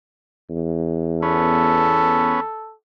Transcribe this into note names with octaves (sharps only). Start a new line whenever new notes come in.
E2
B3 C#4 A4